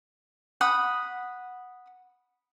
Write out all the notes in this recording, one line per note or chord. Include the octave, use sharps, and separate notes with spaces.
F#5 B5 D#6